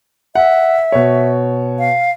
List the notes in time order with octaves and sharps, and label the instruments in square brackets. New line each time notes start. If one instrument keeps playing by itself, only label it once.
[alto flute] E5 [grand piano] F#5
[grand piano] B2 C#5
[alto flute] F5